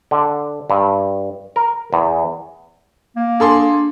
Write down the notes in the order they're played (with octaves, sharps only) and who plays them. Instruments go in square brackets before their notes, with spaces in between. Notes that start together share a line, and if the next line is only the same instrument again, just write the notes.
[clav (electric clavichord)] D3
G2
A#4
E2
[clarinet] A#3
[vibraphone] D4 [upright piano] G#4 A4 C6